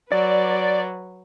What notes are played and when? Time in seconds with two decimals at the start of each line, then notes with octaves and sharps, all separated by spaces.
0.12 F#3 B4 D5